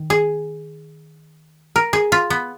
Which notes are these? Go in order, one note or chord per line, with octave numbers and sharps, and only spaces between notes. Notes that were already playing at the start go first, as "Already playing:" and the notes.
Already playing: D#3
G#4
A#4
G#4
F4
B3